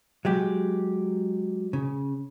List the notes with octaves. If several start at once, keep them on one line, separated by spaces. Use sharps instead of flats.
F#3 G#3 G4
C#3